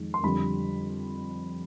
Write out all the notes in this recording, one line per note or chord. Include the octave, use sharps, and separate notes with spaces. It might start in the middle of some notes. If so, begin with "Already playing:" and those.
Already playing: F2 D#3 G#3
C6
F2 D3 G3 B5